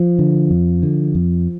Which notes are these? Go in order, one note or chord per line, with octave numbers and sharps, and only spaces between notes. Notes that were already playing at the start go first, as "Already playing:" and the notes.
Already playing: F3
D3
F2
D3
F2